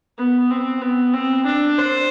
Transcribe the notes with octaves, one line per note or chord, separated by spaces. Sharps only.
B3
C4
B3
C4
D4
C5